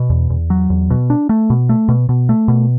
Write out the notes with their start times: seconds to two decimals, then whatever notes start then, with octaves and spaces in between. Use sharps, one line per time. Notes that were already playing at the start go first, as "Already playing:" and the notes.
Already playing: B2
0.10 E2
0.30 E2
0.50 F#3
0.70 E2
0.90 B2
1.10 D4
1.29 A3
1.50 B2
1.69 A3
1.89 B2
2.09 B2
2.29 A3
2.48 B2